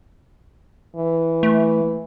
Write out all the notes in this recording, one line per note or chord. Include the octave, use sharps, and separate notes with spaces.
E3
A3